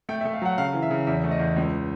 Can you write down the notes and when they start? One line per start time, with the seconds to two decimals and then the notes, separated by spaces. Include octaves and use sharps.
0.09 A3 G5
0.21 E5
0.25 A3
0.34 F5
0.42 F#3 F#5
0.58 C#3 F5
0.74 E3
0.82 E5
0.91 C#3
1.07 E2 E5
1.24 A3
1.31 D#5
1.39 E2
1.56 C#2